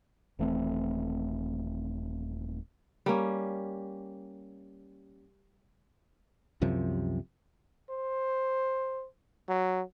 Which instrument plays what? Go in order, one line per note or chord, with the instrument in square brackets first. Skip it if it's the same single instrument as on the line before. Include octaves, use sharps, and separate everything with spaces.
[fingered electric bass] D#1 E3 A3 C4
[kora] G3 A#3 C#4
[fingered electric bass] C2 F#2 C3 F3
[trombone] C5
F#3